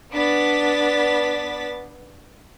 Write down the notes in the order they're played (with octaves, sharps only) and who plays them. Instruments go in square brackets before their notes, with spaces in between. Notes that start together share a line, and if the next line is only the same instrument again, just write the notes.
[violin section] B3 D4 A6 B6